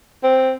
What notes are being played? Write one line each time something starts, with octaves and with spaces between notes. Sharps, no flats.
C4